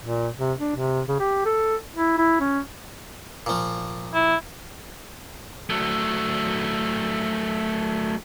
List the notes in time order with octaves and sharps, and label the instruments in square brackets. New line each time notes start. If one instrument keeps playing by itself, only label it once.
[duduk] A#2
C3
D4
C3
C#3
G4
A4
E4
E4
C#4
[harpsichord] A#2 F3
[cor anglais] E4
[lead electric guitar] F#3 A3